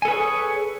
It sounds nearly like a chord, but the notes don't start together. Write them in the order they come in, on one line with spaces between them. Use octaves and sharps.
G#5 A4 B4 C#5 G#4